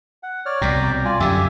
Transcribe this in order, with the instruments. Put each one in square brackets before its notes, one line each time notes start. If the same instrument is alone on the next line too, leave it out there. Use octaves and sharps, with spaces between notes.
[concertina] F#5
C#5 D5 F6
[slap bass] C2 B2 [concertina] D5 G5 A#5
[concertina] F4 D5 G#5
[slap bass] F#2 B2 D3 [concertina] G4 E5 G#5